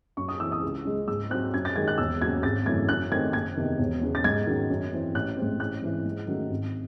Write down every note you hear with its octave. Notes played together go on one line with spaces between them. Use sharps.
F#2 C#6
D#6
E3 C4 E6
D#6
C#2
C#3 G#3 C#4
G#2 E6
F#3 C4 F#6
F#2 G#6
A6
D#3 G#3 G#6
F#6
E1 E6
D#2 C#3 F#3 C#4 G#6
G#1 A6
F#2 C#3 E3 A3 G#6
F#2 F#6
D#3 A3 C4 G#6
F#1 G#6
E2 C3 D#3
E1
E2 C#3
A6
G#2 G#6
D#3 F#3 C#4
F#2
E3 C4
A1 F#6
A2 G#3 C4
A1 F#6
G#2 E3 C4
G#2
D#3 F#3 A3 C#4
G#1